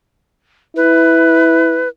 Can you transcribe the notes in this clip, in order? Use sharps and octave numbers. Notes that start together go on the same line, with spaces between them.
E4 B4